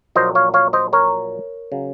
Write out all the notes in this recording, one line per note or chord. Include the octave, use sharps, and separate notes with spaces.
A#1 A#2 F#3 C5 D#5
C#5 F5
C#5 F5
C5 D#5
A#4 C#5
C#3 F#3